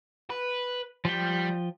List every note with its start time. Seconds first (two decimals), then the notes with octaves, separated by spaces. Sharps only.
0.30 B4
1.05 F3 G3 G5